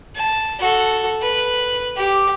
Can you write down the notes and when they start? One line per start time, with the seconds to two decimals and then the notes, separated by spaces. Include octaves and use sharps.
0.15 A5
0.59 F#4 A4
1.22 B4
1.96 G4 D6